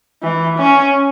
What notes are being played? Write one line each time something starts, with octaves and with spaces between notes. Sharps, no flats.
E3
C#4